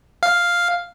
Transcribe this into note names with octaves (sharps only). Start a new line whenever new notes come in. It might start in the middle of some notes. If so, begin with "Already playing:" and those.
F5